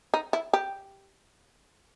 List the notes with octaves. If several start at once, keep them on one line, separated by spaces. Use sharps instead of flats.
D#4
E4
G4